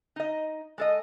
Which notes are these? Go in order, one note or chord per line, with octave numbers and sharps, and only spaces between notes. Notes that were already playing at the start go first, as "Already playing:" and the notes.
D#4 D#5
G#3 A4 D#5